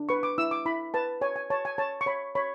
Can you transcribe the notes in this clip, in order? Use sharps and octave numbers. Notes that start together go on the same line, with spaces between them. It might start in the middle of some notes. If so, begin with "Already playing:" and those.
Already playing: D4
B4 C#6
D6
E4 E6
D6
E4 B5
B4 A5
C#5 G#5
G#5
C#5 A5
G#5
C#5 A5
C#6
C#5 B5
C#5 B5